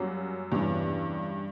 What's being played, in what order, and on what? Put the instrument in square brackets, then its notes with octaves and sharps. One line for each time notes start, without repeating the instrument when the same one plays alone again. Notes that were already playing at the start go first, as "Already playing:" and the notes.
Already playing: [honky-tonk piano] F#2 [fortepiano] G3 A#3 C#4 F#4
[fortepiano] E2 C#3 E3 [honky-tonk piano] G2